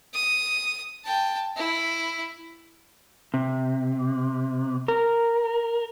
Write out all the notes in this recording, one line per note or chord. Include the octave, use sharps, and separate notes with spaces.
D#6
G5 A5
E4
C3
A#4